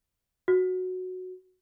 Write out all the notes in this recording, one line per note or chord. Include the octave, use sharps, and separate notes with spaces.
F#4